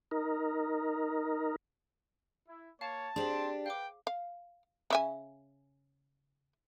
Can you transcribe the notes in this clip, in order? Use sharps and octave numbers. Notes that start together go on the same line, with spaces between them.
D#4 A#4
E4
A#3 C#5 F5 A5
C4 D4 G4 G#4 C5 C6 F#7
B4 F5 G5 D6
F5
C#3 E5 G#5